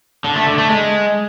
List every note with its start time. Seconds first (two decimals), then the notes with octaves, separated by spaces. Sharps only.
0.24 D3
0.35 A3
0.47 D3
0.58 A3
0.69 G#3